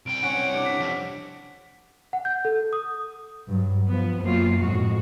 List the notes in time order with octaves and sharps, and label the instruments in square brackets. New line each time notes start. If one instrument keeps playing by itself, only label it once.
[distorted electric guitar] C2 G5 [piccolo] D7
[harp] C#4 [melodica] F#5
[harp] C5
C3 D4
[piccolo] B6
[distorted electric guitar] F2
[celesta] F#5
G6
A4
D#6
[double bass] G2 F#3
[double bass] F3 [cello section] B3
[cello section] F#2 F4 [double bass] F#3 A#3
[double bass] F2 A2 [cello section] G#3 F#4